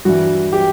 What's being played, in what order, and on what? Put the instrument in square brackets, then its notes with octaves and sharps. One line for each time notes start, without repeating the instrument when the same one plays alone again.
[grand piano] G2 E3 F#4
G4